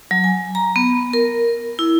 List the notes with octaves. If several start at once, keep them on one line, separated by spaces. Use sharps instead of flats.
F#3
G#5
A#5
B3
A#4
E4